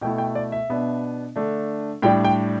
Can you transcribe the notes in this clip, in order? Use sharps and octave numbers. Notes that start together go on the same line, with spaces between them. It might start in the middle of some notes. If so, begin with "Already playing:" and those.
B2 A3 E4 G5
G5
D5
E5
B2 B3 D4
D3 A3 D4
A2 G3 D4 G5
G5